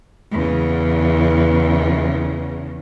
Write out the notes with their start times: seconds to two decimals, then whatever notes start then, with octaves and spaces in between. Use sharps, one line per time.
0.32 E2 C#3